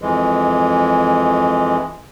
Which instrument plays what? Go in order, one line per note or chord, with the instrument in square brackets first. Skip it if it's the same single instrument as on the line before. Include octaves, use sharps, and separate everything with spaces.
[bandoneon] F2 E3 G#3